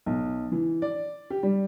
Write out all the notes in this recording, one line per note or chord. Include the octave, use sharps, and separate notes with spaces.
B1
E3
D5
G4
G3